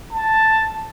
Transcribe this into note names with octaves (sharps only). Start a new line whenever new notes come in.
A5